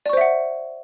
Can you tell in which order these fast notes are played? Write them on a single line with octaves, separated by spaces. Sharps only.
D5 C#6 C5 E5 F#5